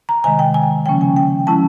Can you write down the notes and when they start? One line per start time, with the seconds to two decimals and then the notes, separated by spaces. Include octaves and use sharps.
0.09 A#5
0.24 C3 D#3 G#3 G#5
0.39 G5
0.54 G#5
0.86 C#3 F3 A#3 C#4 G5
1.01 G#5
1.16 G5
1.47 F3 G#3 C#4 E4 A5